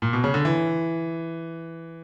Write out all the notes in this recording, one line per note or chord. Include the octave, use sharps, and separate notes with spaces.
A#2
B2
C#3
D3
E3